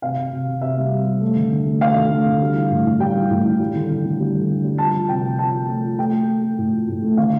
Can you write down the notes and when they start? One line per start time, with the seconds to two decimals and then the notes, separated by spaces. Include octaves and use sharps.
0.02 C3 F5
0.17 C3
0.32 C3
0.47 C3
0.61 C3 E5
0.78 G3
0.92 G3
1.07 G3
1.21 A3
1.36 D3
1.52 D3
1.66 A3
1.81 A3 F5
1.96 D3
2.10 A3
2.26 D3
2.41 G3
2.55 E3
2.71 A2
2.86 A2
3.00 G3 G5
3.15 E3
3.31 A2
3.45 E3
3.60 G3
3.75 D3
3.90 D3
4.05 D3
4.20 G3
4.34 D3
4.50 D3
4.64 G3
4.78 F3 A5
4.94 F3
5.09 C3 G5
5.24 F3
5.38 F3 A5
5.53 F3
5.68 A3
5.83 F3
5.98 A3 G5
6.13 A3
6.28 A3
6.43 A3
6.58 A2
6.73 F3
6.88 A2
7.03 A3
7.17 D3 F5